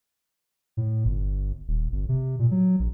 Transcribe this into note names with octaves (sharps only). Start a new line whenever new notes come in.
A2
G1
D#1
G1
C3
A#2
F#3
A#1